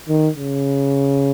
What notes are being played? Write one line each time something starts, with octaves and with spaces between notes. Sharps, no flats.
D#3
C#3